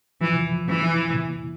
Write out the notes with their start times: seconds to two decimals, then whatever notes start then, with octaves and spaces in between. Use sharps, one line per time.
0.21 E3 F3
0.52 F3
0.68 E3
0.83 E4
1.14 A#2